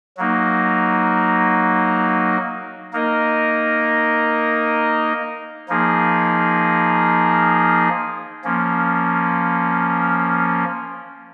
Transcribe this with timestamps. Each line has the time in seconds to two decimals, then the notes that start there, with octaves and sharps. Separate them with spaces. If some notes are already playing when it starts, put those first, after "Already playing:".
0.17 F#3 A#3 D#4
2.93 A#3 D#4 A#4 D#5
5.68 F3 A#3 D#4 G#4
8.44 F3 A#3 C#4